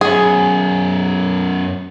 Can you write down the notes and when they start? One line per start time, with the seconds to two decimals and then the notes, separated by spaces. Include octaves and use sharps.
0.01 F#2 B3 G#4